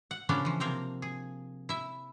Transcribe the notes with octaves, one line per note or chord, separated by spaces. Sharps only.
F#5
C#3 F3 A#3 B3 C#4 D4
E3 F3
C3 A#3 C4 A#4 F5
G#4
E4 E5